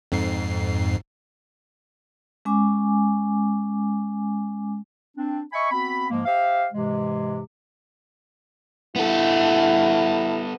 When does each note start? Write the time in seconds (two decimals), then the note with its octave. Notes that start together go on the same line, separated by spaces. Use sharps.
0.12 F2 G#2 C7
2.45 G#3 C#4 G#5 D6
5.17 C4 D4
5.53 D#5 E5 G#5 B5 C#6
5.71 B3 C4 F#4 B5
6.10 G#2 F3 G#3 A#3
6.26 G4 C5 E5 F5
6.73 G#2 C3 E3 G#3
8.96 B3 E4 A4